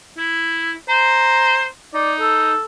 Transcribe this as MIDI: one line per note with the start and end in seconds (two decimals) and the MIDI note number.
0.18 0.73 64
0.89 1.66 72
0.89 1.67 82
1.94 2.53 63
1.94 2.13 74
2.20 2.65 69